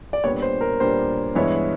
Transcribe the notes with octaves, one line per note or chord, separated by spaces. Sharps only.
D5
A#2 G3 B3 D4 C#5
C5
A#4
A#2 G3 B3 D4 C5
G2 E3 G#3 B3 E4 C#5